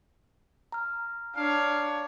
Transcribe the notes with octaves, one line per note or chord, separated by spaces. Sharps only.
A#5 F6
D4 C#5 F5